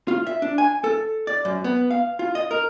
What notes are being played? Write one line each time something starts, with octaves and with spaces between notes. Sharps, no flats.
F4
E5
D4
G#5
A4
D5
F#2
B3
F5
F4
D#5
A#4